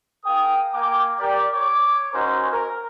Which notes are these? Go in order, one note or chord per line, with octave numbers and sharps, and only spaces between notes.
G#4 A#4 F5 G5 D#6
A#3 G5 G#5 D6
G4 A#4 D5
C#5 D6
C#4 D#4 F4 F#4 A#4 C5
A#4